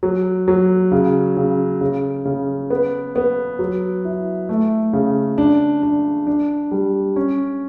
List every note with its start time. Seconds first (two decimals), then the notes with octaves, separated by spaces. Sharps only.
0.03 F#3
0.48 F#3
0.92 C#3
1.37 C#3
1.81 C#3
2.25 C#3
2.70 B3
3.16 B3
3.59 F#3
4.05 E4
4.49 A3
4.93 C#3
5.38 D4
5.83 D4
6.27 D4
6.71 G3
7.16 C#4